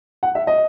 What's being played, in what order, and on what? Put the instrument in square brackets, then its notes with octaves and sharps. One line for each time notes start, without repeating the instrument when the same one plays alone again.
[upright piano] F#5
E5
D#5